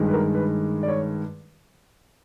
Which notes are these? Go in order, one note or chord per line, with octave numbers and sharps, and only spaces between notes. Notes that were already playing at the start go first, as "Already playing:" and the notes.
Already playing: G2 D#3 G#3
B4
A#4
B4
D5
C#5